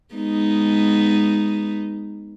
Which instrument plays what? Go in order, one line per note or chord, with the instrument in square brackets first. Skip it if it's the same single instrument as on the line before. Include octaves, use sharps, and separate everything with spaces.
[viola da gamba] G#3 B3 D#4